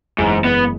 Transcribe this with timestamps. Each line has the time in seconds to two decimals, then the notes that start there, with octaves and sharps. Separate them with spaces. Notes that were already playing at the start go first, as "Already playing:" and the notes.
0.18 F#1 E2 G#2 E3 G#3
0.45 B3